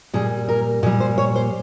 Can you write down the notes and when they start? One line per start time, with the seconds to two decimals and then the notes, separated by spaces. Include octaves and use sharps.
0.14 A#2 G3 G#4
0.49 A#4
0.83 A#2 G#4
0.86 G3
1.00 C5
1.18 C#5
1.36 C5